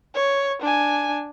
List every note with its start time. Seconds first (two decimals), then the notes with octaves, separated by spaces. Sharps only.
0.15 C#5
0.62 D4 G#5